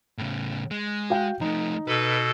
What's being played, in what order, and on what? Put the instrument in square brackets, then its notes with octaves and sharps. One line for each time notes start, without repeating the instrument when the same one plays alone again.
[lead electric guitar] A2 C#3
G#3
[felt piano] F#4 F5 G5
[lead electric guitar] F3 A3 [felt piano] D#4
[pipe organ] B2 A4 [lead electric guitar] B4